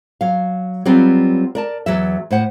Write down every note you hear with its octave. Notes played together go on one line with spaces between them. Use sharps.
F#3 F5
F#3 G3 B3 C4 F4
A#4 D5 A5
E2 F#3 E5
A2 C5 F#5